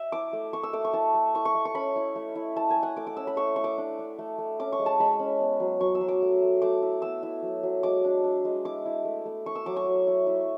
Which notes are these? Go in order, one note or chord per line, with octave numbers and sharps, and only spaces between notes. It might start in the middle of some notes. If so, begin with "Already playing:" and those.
Already playing: E5
E4 D6
A3
E4 C#6
E6
A3 D6
C#6
E4 A5
A3
E4 C#6
C#6
A3
C#6
C#4 B5
E4
A3
E4
E4 A5
G#5
A3
F#5
A3 D6
D6
C#4 E6
B5
A3 C#6
A3 C#6
D6
D4
D4
A3
A3
C#4 D6
C#6
G#3
A5
G#3 B5
C#4
B3
F#3
F#3 C#6
E6
F#3
D6
A3
A3
A3 D6
E4
B3 E6
E4
F#3
F#3
G#3 D6
D4
D4
G#3
E4 D6
E4
A3
A3
E4 C#6
E6
F#3 D6
C#6
F#3
E4
E4